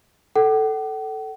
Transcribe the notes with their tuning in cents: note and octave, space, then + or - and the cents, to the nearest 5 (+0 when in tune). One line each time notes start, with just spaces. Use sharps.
A4 +0 F#5 +45